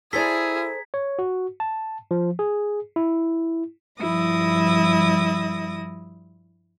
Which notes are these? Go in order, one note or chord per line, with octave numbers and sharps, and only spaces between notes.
E4 G#4 A4 C5 D5 A#5 G#6 B6
C#5
F#4
A5
F3
G#4
E4
G2 F3 G3 E4 D#6 A#6